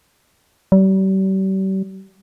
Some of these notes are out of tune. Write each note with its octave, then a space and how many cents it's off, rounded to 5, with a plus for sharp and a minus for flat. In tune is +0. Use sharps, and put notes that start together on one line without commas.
G3 -40